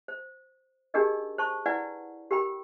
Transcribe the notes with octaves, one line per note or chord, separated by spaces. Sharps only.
C5
D4 D#4 G4 G#4 A#4 D#5
C5 A5 C#6
E4 B4 D5 F#5 G#5
G4 A#4 G5 B5